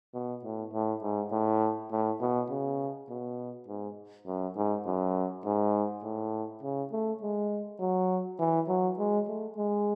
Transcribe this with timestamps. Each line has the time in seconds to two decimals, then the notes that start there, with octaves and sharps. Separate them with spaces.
0.14 B2
0.44 A2
0.73 A2
1.02 G#2
1.32 A2
1.91 A2
2.21 B2
2.50 C#3
3.09 B2
3.68 G#2
4.27 F#2
4.56 G#2
4.86 F#2
5.45 G#2
6.03 A2
6.63 C#3
6.92 A3
7.22 G#3
7.80 F#3
8.39 E3
8.68 F#3
8.99 G#3
9.28 A3
9.57 G#3